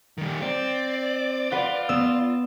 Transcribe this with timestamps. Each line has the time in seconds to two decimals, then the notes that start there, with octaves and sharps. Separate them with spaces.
0.18 D#3 G3
0.42 C4 D5
1.52 F4 B4 F#5
1.89 B3 E6